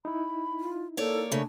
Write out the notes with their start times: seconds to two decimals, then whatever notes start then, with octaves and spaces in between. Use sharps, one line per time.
0.05 D#4 E4 B5
0.60 F4
0.97 A#3 A4 C#5 D5
1.32 C#3 A3 C#4 D4